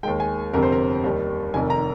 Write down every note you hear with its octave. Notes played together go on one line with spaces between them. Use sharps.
D#2 D#3 G#3 G5
G#5
G1 F2 C3 A#4
C5
A#4
D#2 D#3 G3
F1 F2 D#3 G#5
A#5